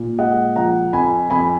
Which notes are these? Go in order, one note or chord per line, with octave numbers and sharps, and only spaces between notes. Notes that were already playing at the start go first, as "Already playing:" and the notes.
Already playing: A#2
G#3 D#5 F#5
F3 F#5 A#5
F2 G#5 B5
F2 G#5 B5